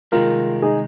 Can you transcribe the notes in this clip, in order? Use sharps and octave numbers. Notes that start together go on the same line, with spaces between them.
C2 C3 D#3 G#3 C4 F4 A#4
D#4 G#4